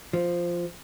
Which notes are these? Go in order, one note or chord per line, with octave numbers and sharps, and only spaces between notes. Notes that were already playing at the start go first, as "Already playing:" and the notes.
F3